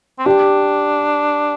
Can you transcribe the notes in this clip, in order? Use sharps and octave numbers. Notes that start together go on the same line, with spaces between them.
C4
D4 G4